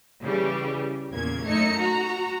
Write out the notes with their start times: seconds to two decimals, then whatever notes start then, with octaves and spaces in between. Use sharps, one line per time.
0.24 C#3 E3 G3
1.12 E2 A#2 C#3 A#3 G#6
1.46 F#2 A3 D#4 C#5 C#7
1.75 F#4 A#5